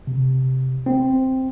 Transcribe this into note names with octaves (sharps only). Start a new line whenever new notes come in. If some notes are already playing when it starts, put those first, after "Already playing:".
C3
C4